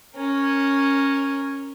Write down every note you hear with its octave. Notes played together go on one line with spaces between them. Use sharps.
C#4 A#4